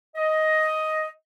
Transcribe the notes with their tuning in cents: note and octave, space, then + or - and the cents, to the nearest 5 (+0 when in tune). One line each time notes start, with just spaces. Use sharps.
D#5 +10